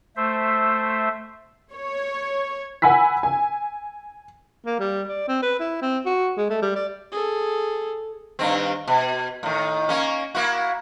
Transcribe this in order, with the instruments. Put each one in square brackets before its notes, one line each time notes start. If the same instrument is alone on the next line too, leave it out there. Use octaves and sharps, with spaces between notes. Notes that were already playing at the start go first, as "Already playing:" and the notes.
[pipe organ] A3 C5 E5
[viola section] C#5
[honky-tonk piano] F#5 G#5 B5 E6 B6
G#5
[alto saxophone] A#3
G3
D5
C4
B4
E4
C4
F#4
G#3
A3
G3
D5
[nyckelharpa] G#4 A4
[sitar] G2 D#3 C4
B2
A2 D#3
A#3 C#4
A#3 E4 F#4